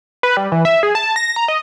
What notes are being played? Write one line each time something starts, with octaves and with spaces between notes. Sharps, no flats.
B4
G3
E3
E5
G#4
A5
A#6
A#5
D#5